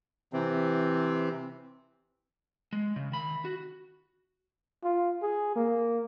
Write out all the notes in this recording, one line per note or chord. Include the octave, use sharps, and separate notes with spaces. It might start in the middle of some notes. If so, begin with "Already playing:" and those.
C3 E3 C4
G#3
C#3
D#3 B5
F#4
F4
G#4
A#3